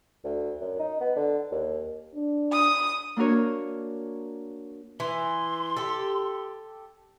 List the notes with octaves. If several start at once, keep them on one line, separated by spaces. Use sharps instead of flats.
D2
F#2
D#4
B3
D3
D#2
D4
D#6
A#3 D4 F#4 A#4 C#5
E3 C6
G4 A4